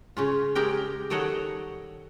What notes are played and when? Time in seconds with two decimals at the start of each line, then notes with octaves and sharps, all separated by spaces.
0.17 C#3 C#4 F4
0.55 G#3 G4 A#4 G5
1.10 D#3 G3 A4 C#5 D#5 F#5